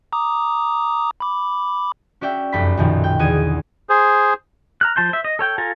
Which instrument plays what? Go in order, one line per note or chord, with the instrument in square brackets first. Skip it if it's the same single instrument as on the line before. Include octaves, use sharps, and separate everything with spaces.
[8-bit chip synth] A#5 D6 D#6
B5 D6
[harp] C#4 F#4 D5 E5 G5
F1 F#2 A4 B5 B6
B1 F#2 A#2 D#3 F3 B3
G5
E2 D3 D#6 G#6 D#7
[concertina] G#4 C5
[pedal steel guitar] A#5 F6 F#6
F3 A5 C6 G6
C5 E5
D#5
A4 C#5 G5
F4 A4 G#5 A#5